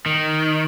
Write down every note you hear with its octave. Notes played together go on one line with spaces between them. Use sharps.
D#3